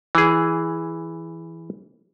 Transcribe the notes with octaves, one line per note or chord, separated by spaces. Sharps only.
E3 G#4